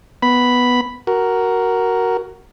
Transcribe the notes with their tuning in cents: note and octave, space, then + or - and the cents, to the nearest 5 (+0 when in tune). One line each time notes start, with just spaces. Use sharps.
B3 +0 B5 +0
F#4 +15 A#4 +0